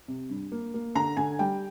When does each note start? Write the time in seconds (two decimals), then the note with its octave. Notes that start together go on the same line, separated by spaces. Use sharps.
0.08 C3
0.30 G2
0.52 A#3
0.74 A#3
0.95 D3 A#5
1.17 D3 G#5
1.39 G3 G5